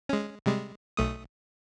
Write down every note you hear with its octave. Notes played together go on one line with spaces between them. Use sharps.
G#3 C#4
C3 G3 G#3
B1 A3 D#6